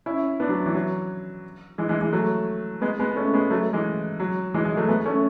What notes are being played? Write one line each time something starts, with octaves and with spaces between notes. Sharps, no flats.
C#4 E4
B3 D4
F#3
E3
F#3
E3 G#3
E3 G#3
E3 G#3
F#3 A3
G#3 B3
G#3 B3
A3 C#4
G#3 B3
F#3 A3
E3 G#3
F#3
E3 G#3
E3 G#3
F#3 A3
G#3 B3
A3 C#4